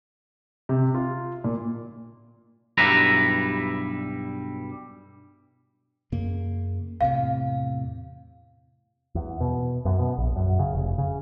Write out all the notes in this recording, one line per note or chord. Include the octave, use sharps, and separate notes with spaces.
C3
F4
A#2
B1 G2 G3 E4 B4 A#5
F#2 C#3 A#3
E2 A2 C3 F5
E2
B2
F#2
B2
A#1
F#2
C#3
F1
C#3